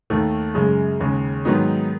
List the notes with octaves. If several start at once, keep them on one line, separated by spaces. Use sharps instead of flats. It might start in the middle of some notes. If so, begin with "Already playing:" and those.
D#2 D#3 A3
F#2 C#3 G#3
D#2 C#3 G#3
G#2 D#3 F#3 B3 D#4